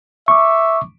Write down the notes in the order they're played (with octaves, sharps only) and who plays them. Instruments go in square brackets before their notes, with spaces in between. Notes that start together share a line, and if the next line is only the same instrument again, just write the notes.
[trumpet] E5 [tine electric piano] C#6 D6